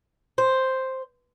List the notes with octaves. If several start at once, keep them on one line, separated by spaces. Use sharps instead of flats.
C5